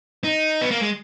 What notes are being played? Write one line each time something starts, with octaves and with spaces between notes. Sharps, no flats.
D#4
B3
A#3
G#3